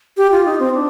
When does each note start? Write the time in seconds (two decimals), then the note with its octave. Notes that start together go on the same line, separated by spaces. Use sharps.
0.17 G4
0.31 F4
0.45 D#4
0.60 C4
0.74 D4